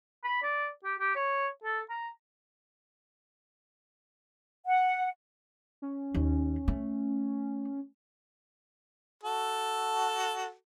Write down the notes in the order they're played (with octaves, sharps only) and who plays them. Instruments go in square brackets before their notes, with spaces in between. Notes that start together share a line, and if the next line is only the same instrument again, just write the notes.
[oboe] B5
D5
G4
G4
C#5
A4
A#5
[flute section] F#5
[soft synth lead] C#4
[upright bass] D#2
A3
[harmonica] F#4 A4